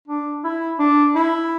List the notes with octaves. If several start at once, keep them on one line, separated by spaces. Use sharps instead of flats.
D4
E4
D4
E4